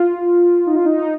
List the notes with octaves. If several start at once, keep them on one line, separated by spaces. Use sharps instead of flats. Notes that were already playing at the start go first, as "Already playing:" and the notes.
Already playing: F4
D#4
F4
D#4